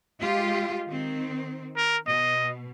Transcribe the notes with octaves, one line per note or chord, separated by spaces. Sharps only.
G#3 F4 G4
D#3 C4
A#4
B2 D#5